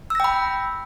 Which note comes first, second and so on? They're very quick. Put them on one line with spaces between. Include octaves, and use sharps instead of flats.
E6 A#6 G5 B5